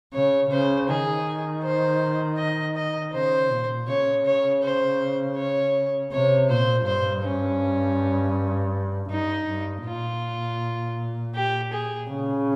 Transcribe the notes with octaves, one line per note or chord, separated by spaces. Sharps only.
C#3 C#5
C#3 C5
D#3 G#4
C5
D#5
D#5
C#3 C5
A#2
C#3 C#5
C#5
C5
C#5
C3 C#5
A#2 C5
G2 C5
C#4
G2 D#4
G2
A#2 F4
G4
G#4
C#3